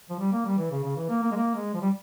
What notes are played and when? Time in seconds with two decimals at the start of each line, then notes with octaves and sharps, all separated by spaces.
0.10 F3
0.20 G3
0.32 A#3
0.45 G3
0.58 E3
0.71 C#3
0.84 C#3
0.97 E3
1.09 A#3
1.23 A#3
1.31 G#3
1.36 A#3
1.55 G#3
1.74 F3
1.81 G3